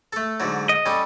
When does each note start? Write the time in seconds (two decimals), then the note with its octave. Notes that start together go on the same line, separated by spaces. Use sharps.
0.13 A3 A4
0.40 G#2 D3 F#3
0.69 D#5
0.86 G3 C#4 A4